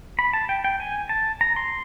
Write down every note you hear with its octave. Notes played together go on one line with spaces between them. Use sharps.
B5
A5
G5
G5
G#5
A5
A#5
C6